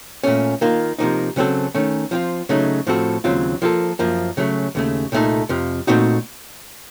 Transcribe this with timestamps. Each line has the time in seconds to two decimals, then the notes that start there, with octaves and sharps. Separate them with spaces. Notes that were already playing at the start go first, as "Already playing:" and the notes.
0.24 A#2 A3 C#4
0.61 D#3 A#3 F4
0.99 C3 F3 A#3 D#4
1.36 C#3 F#3 C4 F#4 A4
1.75 D#3 A3 C#4
2.11 F3 C4 F4
2.49 C#3 F#3 A3 D#4
2.87 A2 F3 C4 F#4 A4
3.24 D#2 C#3 F#3 C4 F4
3.62 F3 A#3 F4 A4
3.99 F#2 F3 A#3
4.37 C#3 F#3 A3
4.75 D#2 C#3 A3
5.12 C2 A#2 A3 D#4 A4
5.49 F2 C3 F3
5.87 A#2 A3 C4 D#4 F#4